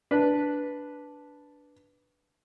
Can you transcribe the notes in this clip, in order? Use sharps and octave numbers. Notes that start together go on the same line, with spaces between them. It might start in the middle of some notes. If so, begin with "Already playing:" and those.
D4 B4